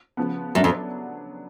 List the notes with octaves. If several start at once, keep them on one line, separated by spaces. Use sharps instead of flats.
C#3 F3 B3
F#2 F#3 B3 D4
F2